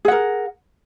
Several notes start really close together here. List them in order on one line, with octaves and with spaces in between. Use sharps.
G#4 F#5 A#4